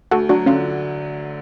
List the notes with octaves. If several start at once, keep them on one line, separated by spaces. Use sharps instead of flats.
D2 F#4 A4
F#3 D4 F#4
D3 C#4 F4